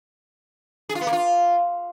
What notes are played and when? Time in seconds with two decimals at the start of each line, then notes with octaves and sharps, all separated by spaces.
0.89 G#4
0.95 F4
1.01 B3
1.07 A#3
1.13 F4